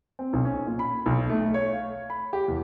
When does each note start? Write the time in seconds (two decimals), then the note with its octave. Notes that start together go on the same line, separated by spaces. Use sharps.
0.19 C4
0.33 B1
0.45 C#4
0.66 A#2
0.79 B5
1.06 B1
1.29 A3
1.54 C#5
1.73 F5
2.10 B5
2.33 G4
2.48 E2